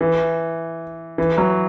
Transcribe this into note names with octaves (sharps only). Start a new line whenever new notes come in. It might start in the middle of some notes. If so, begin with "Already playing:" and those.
E3
E3
F#3